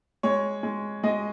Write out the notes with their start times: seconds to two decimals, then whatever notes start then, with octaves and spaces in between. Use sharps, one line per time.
0.23 G#3 C#5
0.63 G#3
1.03 G#3 D#5